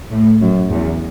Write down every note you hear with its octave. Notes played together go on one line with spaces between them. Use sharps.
A2
F#2
E2